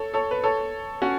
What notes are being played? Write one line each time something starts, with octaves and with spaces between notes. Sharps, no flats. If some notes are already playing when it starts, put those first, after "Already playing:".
Already playing: A4 C#5
A4 C#5
B4
A4 C#5
C#4 F#4